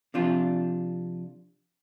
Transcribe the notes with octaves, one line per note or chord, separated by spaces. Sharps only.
C3 F3 D4 F4